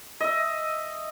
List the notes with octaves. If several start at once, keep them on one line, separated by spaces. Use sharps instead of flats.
D#5 E5